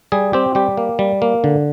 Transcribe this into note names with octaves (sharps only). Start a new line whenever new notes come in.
G3 G#4
C4 G4
G3 G4
A#3
G3
A#3
D3